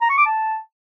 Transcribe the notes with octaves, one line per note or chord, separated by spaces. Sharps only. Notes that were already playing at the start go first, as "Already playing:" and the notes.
A#5
C#6
D6
A5